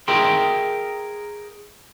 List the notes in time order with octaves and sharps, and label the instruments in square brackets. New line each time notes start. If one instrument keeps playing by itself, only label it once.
[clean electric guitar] G#4 A#4 E5 G5 C6